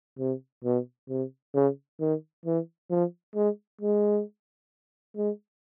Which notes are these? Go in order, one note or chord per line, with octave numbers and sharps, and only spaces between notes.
C3
B2
C3
C#3
D#3
E3
F3
G#3
G#3
G#3